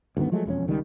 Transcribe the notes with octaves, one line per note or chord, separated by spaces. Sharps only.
D2 G2 D#3 B3
F3 F#3 G#3 A3
E1 F2 G#3 C#4
C#2 D#3 G3